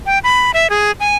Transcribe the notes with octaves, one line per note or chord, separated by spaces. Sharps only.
G5
B5
E5
G#4
G#5